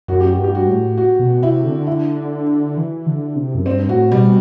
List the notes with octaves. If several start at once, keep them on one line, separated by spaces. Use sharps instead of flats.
F#2 F#4
G4
F#4
G2
G4
F#4
A2
F#4
B2
C3 E4
D3
E4
E3
D3
C3
F#2
G2 C4
A2 F#4
B2 G3